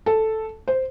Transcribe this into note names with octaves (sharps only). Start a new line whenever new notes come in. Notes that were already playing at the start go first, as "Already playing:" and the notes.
A4
C5